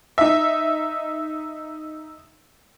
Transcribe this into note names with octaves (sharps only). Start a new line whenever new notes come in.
D#4 E5